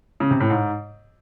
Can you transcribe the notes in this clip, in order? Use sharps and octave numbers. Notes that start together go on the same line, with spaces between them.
C#3
C3
A2
G#2